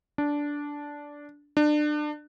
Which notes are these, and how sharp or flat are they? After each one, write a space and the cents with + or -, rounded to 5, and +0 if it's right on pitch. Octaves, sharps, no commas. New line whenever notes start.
D4 -10
D4 +30